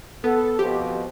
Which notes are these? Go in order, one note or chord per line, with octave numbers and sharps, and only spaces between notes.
B3 A4
F2 B2 F3 G4